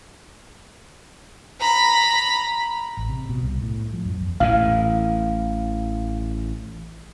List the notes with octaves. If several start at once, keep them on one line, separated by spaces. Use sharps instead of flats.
A#5 B5
A1
C3
B2
C2
A2
F3
F#2
E2
A1 A2 E3 F5